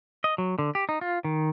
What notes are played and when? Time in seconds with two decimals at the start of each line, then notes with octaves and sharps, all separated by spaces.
0.24 D#5
0.38 F#3
0.59 D3
0.75 G4
0.89 D#4
1.01 F4
1.24 D#3